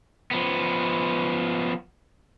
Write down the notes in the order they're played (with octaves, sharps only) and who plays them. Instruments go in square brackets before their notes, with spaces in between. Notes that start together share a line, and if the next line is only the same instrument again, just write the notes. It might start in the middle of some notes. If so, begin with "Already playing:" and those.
[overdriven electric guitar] F3 B3